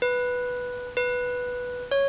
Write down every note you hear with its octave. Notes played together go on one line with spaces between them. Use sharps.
B4
B4
C#5